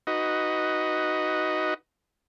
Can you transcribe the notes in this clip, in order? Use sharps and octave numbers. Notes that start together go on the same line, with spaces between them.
D#4 F#4 B4 D#5